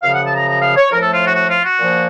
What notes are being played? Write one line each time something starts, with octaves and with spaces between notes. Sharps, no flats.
F#2 C#3 F3 F5
F#5
A5
A#5
A#5
F5
C#5
A2 F3 A3 A#4
A4
F4
F#4
F#4
F4
F#4
A#2 F3 A#3